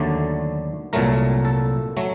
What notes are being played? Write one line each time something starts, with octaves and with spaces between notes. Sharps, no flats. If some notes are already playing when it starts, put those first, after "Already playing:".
Already playing: D#2 D3 F#3 A3 D5
C2 A#2 F#3 A3 A#4
A4
F#3 A3